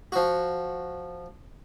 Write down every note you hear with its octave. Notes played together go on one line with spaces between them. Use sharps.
F3 F#4